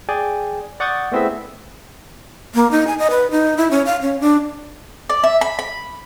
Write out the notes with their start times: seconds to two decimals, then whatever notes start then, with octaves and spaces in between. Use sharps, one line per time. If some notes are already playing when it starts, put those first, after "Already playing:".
0.09 G#4 D5 G5 G#5
0.80 D5 F#5 C#6 D#6 G6 A6
1.12 A3 B3 C4 E4 G#4 E5
2.55 A#3
2.71 D#4
2.87 G#5
2.99 D#5
3.10 B4
3.31 D#4
3.57 E4
3.71 C#4
3.86 F5
4.02 C#4
4.20 D4
5.09 D5
5.24 E5
5.41 B5
5.59 B5